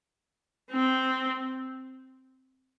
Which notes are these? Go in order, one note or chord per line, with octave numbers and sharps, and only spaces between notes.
C4